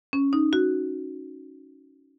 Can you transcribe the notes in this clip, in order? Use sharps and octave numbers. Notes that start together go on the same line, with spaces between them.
C#4
D#4
F#4